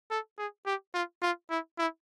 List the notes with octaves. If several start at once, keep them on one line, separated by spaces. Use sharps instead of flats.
A4
G#4
G4
F4
F4
E4
E4